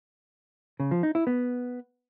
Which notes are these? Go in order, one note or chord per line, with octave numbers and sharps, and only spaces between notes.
C#3
F3
D#4
E4
B3